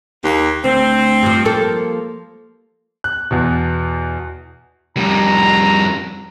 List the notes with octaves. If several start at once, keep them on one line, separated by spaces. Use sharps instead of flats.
D#2 A#3 G4
D2 C4
G2 F3
F3 A#3 A4
F#6
E2 B2
F2 G3 A#5